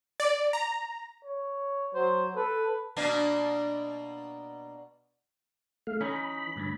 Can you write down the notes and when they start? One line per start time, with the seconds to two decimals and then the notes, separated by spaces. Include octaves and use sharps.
0.20 D5
0.53 A#5
1.25 C#5
1.95 F#3 C5
2.36 A4 B4
2.97 B2 A#3 D4
5.87 A3 F5
6.01 E3 C#4 D#4 B5
6.56 D2 G2